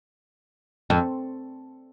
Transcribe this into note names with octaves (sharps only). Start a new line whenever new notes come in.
F2